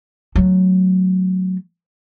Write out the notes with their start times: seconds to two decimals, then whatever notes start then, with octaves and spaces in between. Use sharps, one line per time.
0.36 F#3 A3